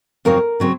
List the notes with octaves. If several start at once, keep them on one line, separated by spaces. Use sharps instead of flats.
F2 C#3 F#3 C4 A#4
C#3 F#3 C4